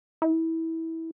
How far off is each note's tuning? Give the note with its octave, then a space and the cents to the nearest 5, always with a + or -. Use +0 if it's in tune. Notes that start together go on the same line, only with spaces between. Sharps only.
E4 -20